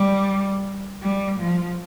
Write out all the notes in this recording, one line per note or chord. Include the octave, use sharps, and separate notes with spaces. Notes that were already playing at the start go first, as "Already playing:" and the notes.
Already playing: G3
G3
F3